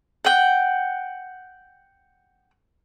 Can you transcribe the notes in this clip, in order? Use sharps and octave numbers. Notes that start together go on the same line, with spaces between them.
F#5 G5